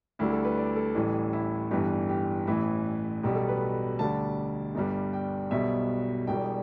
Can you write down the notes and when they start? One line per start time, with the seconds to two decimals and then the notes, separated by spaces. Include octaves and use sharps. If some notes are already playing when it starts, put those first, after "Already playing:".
0.19 D2 D3 G3 E4
0.32 A4
0.44 B4
0.57 D5
0.76 A4
0.95 A1 A2 E3 G3
1.33 E4
1.71 G1 G2 E3 G4
2.09 G4
2.47 A1 A2 E3 E4
3.23 B1 B2 G3 G4
3.36 A4
3.49 B4
3.99 D2 D3 G3 A5
4.75 G1 G2 G3
5.13 G5
5.51 B1 B2 G3 E5
6.27 E1 E2 B2 G3 G5